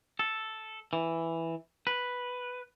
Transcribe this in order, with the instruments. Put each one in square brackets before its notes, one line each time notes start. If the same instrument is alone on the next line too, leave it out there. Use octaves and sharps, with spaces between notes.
[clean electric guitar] A4
E3
B4